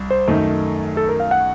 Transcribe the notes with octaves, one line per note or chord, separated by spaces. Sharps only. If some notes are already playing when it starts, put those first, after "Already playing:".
Already playing: C2
C5
F#2 D#3 A3 D#4
A4
A#4
F5
F#5